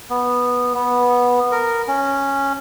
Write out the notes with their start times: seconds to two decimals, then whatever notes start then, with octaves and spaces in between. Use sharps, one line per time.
0.10 B3
0.74 B3
1.52 A#4
1.88 C#4